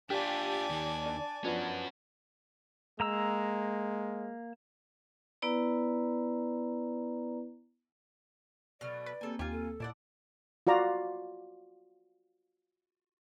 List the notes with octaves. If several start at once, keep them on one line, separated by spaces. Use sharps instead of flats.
D4 F4 G4 D5 G#5 A5
D#2 D#3
D4
F3 B3 C#4 D4 F#4
G#3 A#3 A#5 E6
B3 E4 B4 D5 A#5
B2 F#3 A3 D5 F6
B4
G3 A#3 C4 A4 G#5
D#2 F4 G4 G#5
A4
A#2 E4 D5 F#5 A5 D6
F4 F#4 D5 A#5